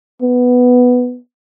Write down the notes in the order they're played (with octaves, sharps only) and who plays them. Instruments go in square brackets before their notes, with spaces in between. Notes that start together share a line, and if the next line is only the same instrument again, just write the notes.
[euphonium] B3